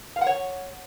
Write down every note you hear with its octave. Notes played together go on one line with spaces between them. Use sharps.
F5
F#5
C#5